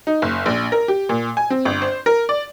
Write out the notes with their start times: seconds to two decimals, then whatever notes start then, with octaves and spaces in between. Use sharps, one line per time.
0.07 D#4
0.22 F#1
0.46 A#1
0.72 A#4
0.88 G4
1.09 A#2
1.37 G#5
1.50 C4
1.65 G1
1.82 C5
2.06 A#4
2.29 D5